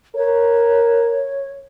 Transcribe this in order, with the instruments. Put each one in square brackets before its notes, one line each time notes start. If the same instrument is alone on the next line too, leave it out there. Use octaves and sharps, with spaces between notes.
[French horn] A#4 [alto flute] C#5